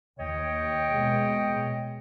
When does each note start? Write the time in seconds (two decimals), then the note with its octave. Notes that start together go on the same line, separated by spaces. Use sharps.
0.19 D#2 C#5 D#5 G5
0.90 B2 G#3